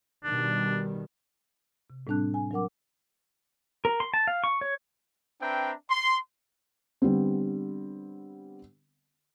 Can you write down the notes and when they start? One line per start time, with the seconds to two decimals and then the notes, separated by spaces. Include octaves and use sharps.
0.24 B2 D#3 G3 D4
1.90 C3
2.07 A2 G3 C4 D4 A5 F#6
2.34 G#5
2.51 F#3 D4 A#4 F#5 D6
3.85 A#4
4.00 C6
4.14 A5
4.27 F5
4.44 C#6
4.61 C#5
5.42 C4 D4 B4 E5 G5 A#5
5.90 C6
7.02 D3 G3 B3 C4